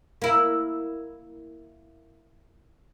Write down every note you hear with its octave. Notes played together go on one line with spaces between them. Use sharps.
A#3 E4